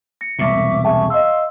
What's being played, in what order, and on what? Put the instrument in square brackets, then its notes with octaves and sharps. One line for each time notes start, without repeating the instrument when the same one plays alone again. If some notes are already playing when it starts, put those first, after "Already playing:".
[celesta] A#6 C#7
[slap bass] E1 C2 A#2 [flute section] E5 C#6 D6
[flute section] G#4 C#6 [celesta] E5 G5 A5
[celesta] D#5 E6 [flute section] F5 C6